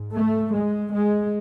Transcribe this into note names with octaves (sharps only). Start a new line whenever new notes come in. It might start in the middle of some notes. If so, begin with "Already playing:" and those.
Already playing: G#2
A3
G#3
G#3